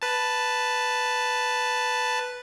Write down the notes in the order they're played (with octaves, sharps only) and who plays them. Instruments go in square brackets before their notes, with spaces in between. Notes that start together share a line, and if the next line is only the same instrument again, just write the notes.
[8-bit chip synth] B4 A5